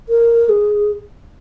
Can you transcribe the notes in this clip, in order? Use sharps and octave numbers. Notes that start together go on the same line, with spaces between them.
A#4
G#4